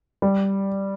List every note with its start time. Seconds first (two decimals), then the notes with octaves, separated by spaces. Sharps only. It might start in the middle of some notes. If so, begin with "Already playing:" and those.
0.22 G3